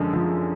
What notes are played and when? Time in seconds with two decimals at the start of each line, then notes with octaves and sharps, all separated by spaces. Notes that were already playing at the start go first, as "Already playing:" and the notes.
Already playing: F#2 D3 F3 G#3
0.13 F3